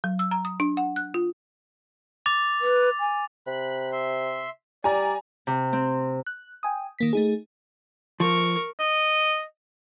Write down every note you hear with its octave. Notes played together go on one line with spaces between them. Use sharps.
F#3
E6
A#5
D#6
D4
F#5
F#6
F4
D6 A6 F7
B4
G#5
C3 B5 F#6
E5 C6
G3 D5 G#5 A#5
C3
C4
F#6
G5 G#5 D#6
D#3 A#3 B6
A3 D#4 G#4
F3 A#4 C#6
D#5